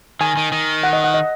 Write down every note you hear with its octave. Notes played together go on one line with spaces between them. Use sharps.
D#3 G#5
D#3
D#3
F#5
D#5
F#5
D#5